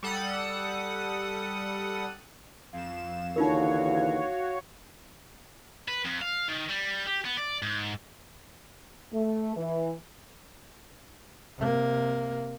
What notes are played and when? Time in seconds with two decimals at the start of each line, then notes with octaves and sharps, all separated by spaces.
0.03 G3 A4 F#5 D#6
2.73 F2 F5 E7
3.36 D#2 D3 E3 D#4 F4 F#4 A#4 C#5
5.88 B4
6.04 F2
6.21 F5
6.48 D#3
6.69 G3
7.07 G4
7.25 B3
7.37 D5
7.63 G#2
9.13 A3
9.57 E3
11.58 C3 A#3